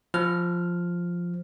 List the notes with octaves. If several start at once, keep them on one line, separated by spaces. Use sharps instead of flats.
F3 F6